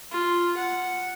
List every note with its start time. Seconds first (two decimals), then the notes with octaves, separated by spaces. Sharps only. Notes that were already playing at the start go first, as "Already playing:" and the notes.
0.11 F4
0.57 F#5